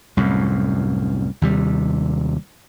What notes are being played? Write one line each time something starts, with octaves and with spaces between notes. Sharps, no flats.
C2 F#2 A2
D#2 C3 G3